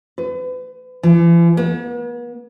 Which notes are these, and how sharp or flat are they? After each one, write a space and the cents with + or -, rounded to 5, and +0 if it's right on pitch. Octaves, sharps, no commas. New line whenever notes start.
B4 +40
E3 +45
B3 -45